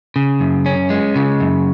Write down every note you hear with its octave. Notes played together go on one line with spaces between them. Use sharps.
C#3
F#2
C#4
G#3
C#3
F#2